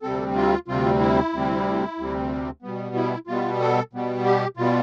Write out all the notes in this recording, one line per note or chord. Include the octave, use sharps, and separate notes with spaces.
D2 C3 G3 C4 A4
F4
D2 C3 G3 C4 F4
E4
D2 C3 G3 C4
D2 C3 G3 C4
B2 G3 B3
E4
B2 G3 B3 F4
A4
B2 G3 B3
G4
B2 G3 B3 F4